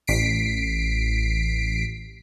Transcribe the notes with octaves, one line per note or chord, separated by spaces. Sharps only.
A1 B6 C7 D7